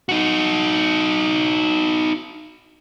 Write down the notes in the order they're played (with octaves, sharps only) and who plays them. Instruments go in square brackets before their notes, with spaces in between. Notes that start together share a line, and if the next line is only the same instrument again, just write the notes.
[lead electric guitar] D#4 F#4